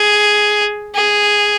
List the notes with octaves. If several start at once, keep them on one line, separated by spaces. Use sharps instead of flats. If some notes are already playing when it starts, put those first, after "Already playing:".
Already playing: G#4
G#4